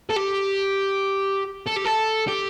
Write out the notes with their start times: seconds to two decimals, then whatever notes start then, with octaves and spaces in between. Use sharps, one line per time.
0.10 A4
0.16 G4
1.66 A4
1.76 G4
1.85 A4
2.28 G4